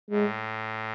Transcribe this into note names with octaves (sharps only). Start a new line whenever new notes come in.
A2 G#3